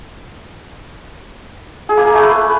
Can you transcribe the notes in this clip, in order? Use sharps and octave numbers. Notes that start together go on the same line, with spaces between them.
G#4
A#3
G#4
A3
B4